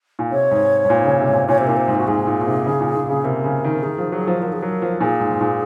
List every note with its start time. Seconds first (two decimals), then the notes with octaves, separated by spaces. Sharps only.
0.19 A#2
0.31 C3 C#5
0.51 G#2
0.85 G#2
0.90 A#2
1.05 C#3
1.19 C3
1.28 G#2
1.33 A#2
1.48 A#2 C#5
1.58 C3 C5
1.67 A#2 A#4
1.77 C5
1.88 G#2
1.98 F#4
2.07 G#2 G#4
2.27 A#2
2.41 A#2
2.47 C3
2.66 C#3
2.80 A#2
2.96 A#2
3.09 C#3
3.24 C3 A#4
3.44 C#3
3.64 D#3
3.83 D#3 G#4
3.98 F3
4.12 F#3
4.27 F3
4.42 F3 A#4
4.52 G#4
4.61 F#3 A#4
4.82 F3
5.01 A#2 G#4
5.20 G#2
5.31 G#2
5.41 A#2